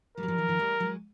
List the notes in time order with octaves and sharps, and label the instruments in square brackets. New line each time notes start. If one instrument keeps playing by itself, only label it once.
[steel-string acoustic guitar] G3 A3 [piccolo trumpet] A#4
[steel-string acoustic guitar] F#3
F3 G3
E3 F#3
D#3 F3
G3 A3
F#3 G#3